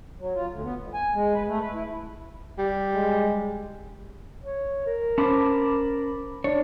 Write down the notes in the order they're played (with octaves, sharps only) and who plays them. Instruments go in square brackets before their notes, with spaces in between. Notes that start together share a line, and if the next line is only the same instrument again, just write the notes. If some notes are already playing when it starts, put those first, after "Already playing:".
[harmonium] F#3
F4
D2
B3
F2
G#5
G#3
B4
A3
B4
E4
[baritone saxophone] G3
[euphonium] G#3
[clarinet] C#5
A#4
[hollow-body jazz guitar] C#4 C5 [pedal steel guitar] A5 B5 D6
[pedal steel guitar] D4 [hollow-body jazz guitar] C#5